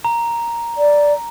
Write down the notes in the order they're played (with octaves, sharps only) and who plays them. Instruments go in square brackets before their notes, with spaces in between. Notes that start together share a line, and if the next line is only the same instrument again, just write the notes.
[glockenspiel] A#5
[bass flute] D5